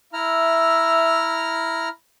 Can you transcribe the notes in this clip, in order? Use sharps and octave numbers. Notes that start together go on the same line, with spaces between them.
E4 E5 A#5 F6